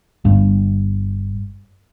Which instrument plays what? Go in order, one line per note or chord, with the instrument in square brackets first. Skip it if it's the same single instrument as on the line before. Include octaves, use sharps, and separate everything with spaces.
[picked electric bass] G1 G2